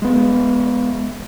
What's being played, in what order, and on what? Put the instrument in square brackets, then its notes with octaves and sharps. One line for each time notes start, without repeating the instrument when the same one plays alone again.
[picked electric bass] G#3 B3